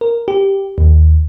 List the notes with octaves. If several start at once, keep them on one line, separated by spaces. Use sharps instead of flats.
A#4
G4
D#2